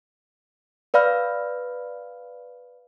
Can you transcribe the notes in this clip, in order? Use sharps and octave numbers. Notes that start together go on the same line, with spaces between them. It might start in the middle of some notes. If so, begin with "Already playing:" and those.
B4 D5 F5 B5 F6